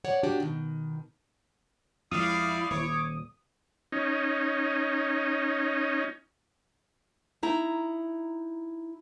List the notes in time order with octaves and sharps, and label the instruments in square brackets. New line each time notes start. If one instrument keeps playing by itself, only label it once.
[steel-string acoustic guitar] C#5 D5 F#5
D4 F#4 G4
B2 D#3
[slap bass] F2 G#3 [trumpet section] G3 D5 F5 [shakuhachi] E4 [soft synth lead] D#6
[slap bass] D#1 [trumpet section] C#5 D6
[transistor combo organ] C#4 D#4
[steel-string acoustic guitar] D#4 E4 A#5